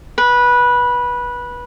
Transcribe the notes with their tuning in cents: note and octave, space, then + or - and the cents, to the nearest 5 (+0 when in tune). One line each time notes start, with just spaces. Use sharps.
B4 -15